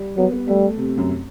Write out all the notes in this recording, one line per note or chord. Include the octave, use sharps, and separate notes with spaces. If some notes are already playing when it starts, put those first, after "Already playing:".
Already playing: G3
F#3 B3
B3
G3 A3
C3
F#2